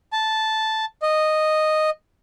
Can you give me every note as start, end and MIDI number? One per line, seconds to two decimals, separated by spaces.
0.13 0.85 81
1.02 1.90 75